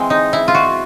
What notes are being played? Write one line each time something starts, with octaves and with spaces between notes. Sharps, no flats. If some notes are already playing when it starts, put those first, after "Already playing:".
Already playing: E3 G#3 C4
D#4
E4
F4
F#4